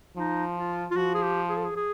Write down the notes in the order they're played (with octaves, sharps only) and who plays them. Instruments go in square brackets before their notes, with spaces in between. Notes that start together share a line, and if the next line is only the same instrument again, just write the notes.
[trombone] F3 [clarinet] D#4
[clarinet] F4
F4
[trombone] F3 [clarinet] F#4
[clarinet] G#4
G4
G#4
A4
G#4
G#4